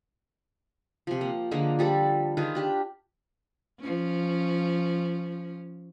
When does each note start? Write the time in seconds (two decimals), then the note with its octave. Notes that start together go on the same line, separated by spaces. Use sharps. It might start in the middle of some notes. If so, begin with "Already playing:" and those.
1.07 C3 F3
1.21 A#3
1.51 D3 F3 G#3 A#3
1.79 F3 G3 A4 D6
2.37 D#3 F4 G#4 B4
2.55 D4 G4
3.80 F3 C#4